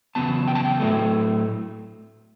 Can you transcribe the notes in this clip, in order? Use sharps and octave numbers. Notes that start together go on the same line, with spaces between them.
E2 C#3 F#3 B3 A5
G5
A5
G5
A2 F#3 A3